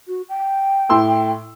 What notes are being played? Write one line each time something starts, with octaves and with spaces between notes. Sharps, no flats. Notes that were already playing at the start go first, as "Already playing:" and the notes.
F#4
G5
A2 C6 E6